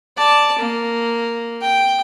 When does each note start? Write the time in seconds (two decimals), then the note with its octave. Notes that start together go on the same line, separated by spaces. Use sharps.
0.17 D5 A5
0.58 A#3
1.61 G5